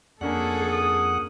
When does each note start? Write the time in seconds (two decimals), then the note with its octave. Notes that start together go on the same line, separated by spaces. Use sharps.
0.21 F2 A#3 C#4 D4 G#4 A4 F#5
0.72 D#6